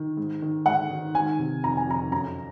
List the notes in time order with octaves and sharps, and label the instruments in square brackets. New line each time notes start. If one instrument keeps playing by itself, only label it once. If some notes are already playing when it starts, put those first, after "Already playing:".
Already playing: [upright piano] D#3
G#2
D#3
G#2 F#5
D#3
D#3 G#5
C3
F2 A#5
G#5
F2 A#5
F#2 A#5